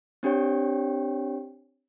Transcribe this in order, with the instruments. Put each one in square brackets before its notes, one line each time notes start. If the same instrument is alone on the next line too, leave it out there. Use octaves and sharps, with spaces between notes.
[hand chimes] C4 D4 G4 C#5 G5